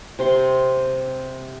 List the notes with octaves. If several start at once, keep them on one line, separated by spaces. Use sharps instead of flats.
C3 C4 C6